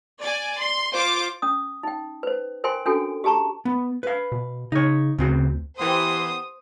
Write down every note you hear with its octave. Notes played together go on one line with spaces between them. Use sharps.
D5 G#5
C6
F4 C5 D6
C#4 D#6
D#4 G5
B4 C5
A#4 C5 G5 G#5 C6
C#4 D4 F#4 A4 G5 G#5
G4 G#4 A5 A#5 C#6
B3
B4 F5
B2
C#3 D#4 C#5
D2 C#3 C4 F#4
E3 B3 G4 A#4 C5 C6 D#6